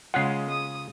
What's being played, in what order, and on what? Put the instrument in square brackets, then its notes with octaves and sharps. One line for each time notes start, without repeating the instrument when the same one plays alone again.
[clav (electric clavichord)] C#3 C#4 F4 [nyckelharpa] G#3 [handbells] F#5 F#6 C7
[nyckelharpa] D#6